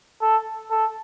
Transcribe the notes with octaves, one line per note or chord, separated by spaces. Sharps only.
A4
A4